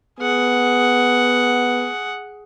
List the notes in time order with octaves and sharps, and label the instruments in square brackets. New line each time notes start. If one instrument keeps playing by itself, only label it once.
[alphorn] B3 [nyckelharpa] G#4 F#5